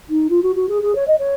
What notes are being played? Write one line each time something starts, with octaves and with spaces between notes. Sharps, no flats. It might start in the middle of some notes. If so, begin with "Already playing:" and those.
D#4
F4
F#4
F#4
G#4
G#4
C#5
D#5
C#5